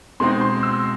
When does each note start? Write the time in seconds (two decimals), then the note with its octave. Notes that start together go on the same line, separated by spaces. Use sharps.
0.20 B2 G#3 C4 D#4 C6
0.41 C6
0.63 E6